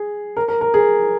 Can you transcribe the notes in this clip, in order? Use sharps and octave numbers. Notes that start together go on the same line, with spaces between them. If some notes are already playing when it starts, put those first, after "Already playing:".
Already playing: G#4
A#4
A#4
A#4
G#4